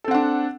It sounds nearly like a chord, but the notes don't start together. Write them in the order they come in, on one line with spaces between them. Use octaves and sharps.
A4 C4 F#5 D4